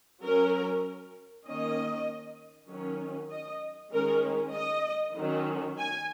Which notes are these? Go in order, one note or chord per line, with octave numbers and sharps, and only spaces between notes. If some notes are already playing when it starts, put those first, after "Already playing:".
F#3 C#4 A#4
D#3 A#3 C#4 D#5
D#3 F#3 C#4
D#5
D#3 G#3 C#4 A#4
D#5
D#3 F#3 C#4
G#5